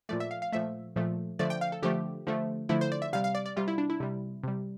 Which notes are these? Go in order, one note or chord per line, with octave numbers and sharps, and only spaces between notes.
A#2 F3 A3 D5
E5
F5
F5
A#2 F3 A3 E5
A#2 F3 A3
D3 F3 A3 D5
G5
F5
A4
D3 F3 A3 G4
D3 F3 A3
D3 F3 A3 E4
C5
D5
E5
C3 G3 F5
F5
D5
D5
C3 G3 F4
E4
D4
E4
C3 G3
C3 G3